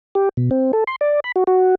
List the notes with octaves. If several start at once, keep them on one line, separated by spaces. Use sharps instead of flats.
G4
B2
C4
A4
C6
D5
B5
F#4
F#4